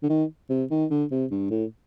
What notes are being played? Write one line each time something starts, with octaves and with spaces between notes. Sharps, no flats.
D3
D#3
C3
D#3
D3
C3
G2
A2